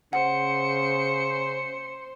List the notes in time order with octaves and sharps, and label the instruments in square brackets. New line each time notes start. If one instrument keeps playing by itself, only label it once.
[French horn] C#3 [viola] C5 [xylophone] F#5 [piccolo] C#7